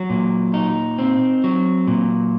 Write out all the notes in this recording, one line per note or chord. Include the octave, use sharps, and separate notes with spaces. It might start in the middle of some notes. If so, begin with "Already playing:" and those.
Already playing: F#3
A#2
D#4
C4
F#3
A#2